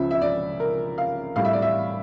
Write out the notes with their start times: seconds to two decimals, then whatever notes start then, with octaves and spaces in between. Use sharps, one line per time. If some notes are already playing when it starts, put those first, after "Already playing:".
Already playing: C#2 C#3 F3 E5
0.11 E5
0.21 D5
0.60 A#4
0.98 F5
1.36 A2 G3 F5
1.45 E5
1.53 D5
1.62 E5